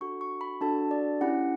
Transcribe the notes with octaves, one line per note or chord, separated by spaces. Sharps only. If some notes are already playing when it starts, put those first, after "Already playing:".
D4 F#4 A4 C#6
C#6
B5
D4 F#4 A4 A5
D5
C#4 E4 G4 F#5